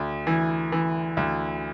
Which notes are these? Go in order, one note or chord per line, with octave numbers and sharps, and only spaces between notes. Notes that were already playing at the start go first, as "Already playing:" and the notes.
Already playing: D2
E3
E3
D2